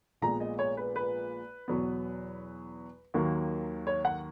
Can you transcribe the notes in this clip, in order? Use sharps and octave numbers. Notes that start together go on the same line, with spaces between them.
A#1 A#2 G#3 B3 A#5
D#5
C#5
B4
B4
E2 B2 F#3 B3
D#2 D#3 F#3 A#3
C#5
F#5